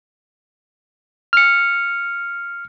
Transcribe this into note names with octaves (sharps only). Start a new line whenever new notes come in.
F6 C#7